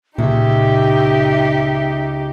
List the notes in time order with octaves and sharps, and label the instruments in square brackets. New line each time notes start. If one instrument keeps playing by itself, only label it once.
[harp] C#2 [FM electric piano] A#2 [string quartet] D#4 G4 [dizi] E5